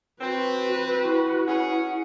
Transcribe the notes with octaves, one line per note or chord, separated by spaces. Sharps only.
C4 F#4 B4
E4 F#4
C#4 G#4 F#5